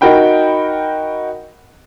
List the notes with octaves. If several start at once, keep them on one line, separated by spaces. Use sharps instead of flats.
D#4 F#4 A#4 G5 B5